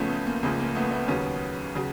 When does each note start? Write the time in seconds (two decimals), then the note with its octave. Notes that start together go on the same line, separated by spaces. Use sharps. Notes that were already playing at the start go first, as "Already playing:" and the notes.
Already playing: C#2 C#3 F3 A3 B3 C#4
0.10 A3
0.27 A#3
0.43 C#2 C#3 F3 A#3
0.60 A#3
0.75 A3 B3
0.91 A3 B3
1.07 D#2 C#3 F#3 B3 C#4
1.75 C#3 F#3